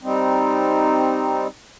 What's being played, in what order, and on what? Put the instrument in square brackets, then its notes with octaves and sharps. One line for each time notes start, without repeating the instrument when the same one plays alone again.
[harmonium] G3 C4 D#4